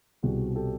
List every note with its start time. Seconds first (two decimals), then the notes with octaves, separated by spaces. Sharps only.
0.23 C2 B2 G3 C4 F#4 G#4
0.56 G4 A4